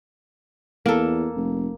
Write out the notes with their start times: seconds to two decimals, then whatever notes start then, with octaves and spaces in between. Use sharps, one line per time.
0.86 E2 A#3 A4
1.36 F1